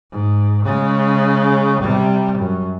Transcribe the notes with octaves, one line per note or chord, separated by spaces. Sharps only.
G#2
C#3 G#3
C3 G3
F#2